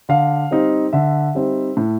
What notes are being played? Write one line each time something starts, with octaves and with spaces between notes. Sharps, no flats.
D3 F5
G3 C4 D#4
D3 E5
G3 C4 D#4
A2